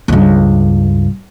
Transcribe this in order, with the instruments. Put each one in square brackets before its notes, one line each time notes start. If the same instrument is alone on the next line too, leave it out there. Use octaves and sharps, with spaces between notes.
[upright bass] C#2 G2